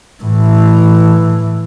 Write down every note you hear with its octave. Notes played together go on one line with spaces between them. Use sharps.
A2 E3